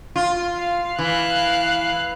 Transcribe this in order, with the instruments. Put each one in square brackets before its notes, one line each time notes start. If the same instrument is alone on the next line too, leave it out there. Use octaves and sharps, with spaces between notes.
[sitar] F4
[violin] F5
[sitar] E3 [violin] F5 F#6